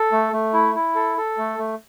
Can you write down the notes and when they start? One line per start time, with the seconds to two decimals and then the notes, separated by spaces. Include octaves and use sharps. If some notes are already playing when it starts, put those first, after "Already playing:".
Already playing: A4
0.12 A3
0.33 A3
0.54 E4
0.75 E4
0.95 A4
1.17 A4
1.38 A3
1.59 A3